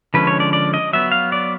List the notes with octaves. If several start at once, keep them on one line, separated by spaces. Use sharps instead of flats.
D3 F3 G#3 C#4 B4
C#5
D5
D5
D#5
F#3 B3 E5
F5
D5